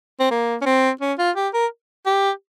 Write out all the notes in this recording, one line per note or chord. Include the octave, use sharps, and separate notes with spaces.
C4
A#3
C#4
C4
C#4
F4
G4
A#4
G4